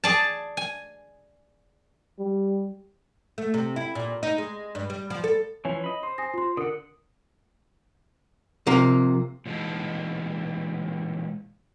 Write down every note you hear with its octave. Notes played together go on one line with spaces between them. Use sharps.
G#4 D5 A5
G#5
G3
A3
C3
E4
A#2
D#4
G#3
G2
G3
F3
A4
E3 F3 C#4 C#5
D#5 B5
C5 C6
G#5 D#6 A#6
F4 C6
D3 A#4 F#5 D#6
C3 F3 A#3
A#2 E3 G#3 D#4 A5